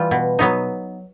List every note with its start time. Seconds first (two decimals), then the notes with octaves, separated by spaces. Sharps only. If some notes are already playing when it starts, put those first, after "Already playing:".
Already playing: E3 G3 F4
0.11 B2
0.39 F#3 B3 D#4